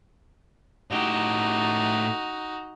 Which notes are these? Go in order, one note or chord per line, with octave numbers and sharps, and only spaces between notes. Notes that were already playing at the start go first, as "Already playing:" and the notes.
A2 D#4 F#4 G4